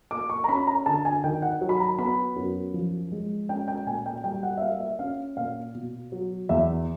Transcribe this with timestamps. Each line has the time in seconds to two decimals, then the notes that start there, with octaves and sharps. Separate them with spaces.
0.11 A#3 D6
0.30 C#6
0.44 A#5
0.49 C#4 B5
0.67 A#5
0.86 D3 A5
1.05 G#5
1.24 D#3 G5
1.42 F#5
1.61 F#3
1.69 B5
1.80 A#5
1.98 B3 B5
2.36 F#2
2.74 F3
3.12 G#3
3.49 C#4 G5
3.68 G5
3.86 A#2 G#5
4.06 G5
4.24 G3 G5
4.43 F#5
4.57 E5
4.61 A#3 F5
4.80 E5
4.99 C#4 F5
5.37 A#2 F5
5.74 B2
6.12 F#3
6.49 E2 E5